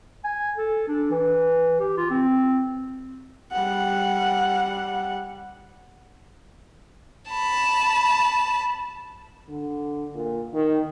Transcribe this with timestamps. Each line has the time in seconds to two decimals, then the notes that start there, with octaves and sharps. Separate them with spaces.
0.24 G#5
0.57 A4
0.88 D4
1.11 E3
1.80 G4
1.97 F4
2.10 C4
3.52 G3 F#5
7.30 A5 B5
9.49 D3
10.14 A#2
10.54 D#3